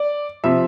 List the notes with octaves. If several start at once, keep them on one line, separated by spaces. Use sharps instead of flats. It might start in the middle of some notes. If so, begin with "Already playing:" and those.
Already playing: D5
C3 F3 E5